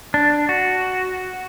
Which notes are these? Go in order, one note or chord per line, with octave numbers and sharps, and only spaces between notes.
D4
F#4